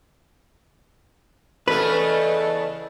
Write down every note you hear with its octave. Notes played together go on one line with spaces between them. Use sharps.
E2 C#3 A3 A4 B4 D#5